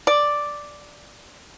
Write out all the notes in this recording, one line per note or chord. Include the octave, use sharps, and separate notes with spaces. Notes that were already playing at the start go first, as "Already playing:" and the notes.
D5